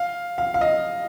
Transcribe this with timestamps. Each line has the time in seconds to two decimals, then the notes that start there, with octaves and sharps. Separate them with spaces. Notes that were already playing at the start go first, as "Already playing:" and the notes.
Already playing: F5
0.38 F5
0.54 F5
0.61 D#5